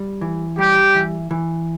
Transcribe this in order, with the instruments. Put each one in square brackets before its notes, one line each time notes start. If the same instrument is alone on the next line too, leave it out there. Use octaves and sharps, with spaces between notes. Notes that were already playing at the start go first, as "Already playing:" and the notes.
Already playing: [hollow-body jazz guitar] G3
E3
[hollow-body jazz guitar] G3 [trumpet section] G4
[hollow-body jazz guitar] E3
E3